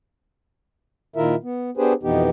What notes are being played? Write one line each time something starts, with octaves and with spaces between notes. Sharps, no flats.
A#2 D#3 E4 F4 A#4 E5
B3
B3 D4 G4 G#4 B4 C5
F2 B2 E3 B3 D#4 G4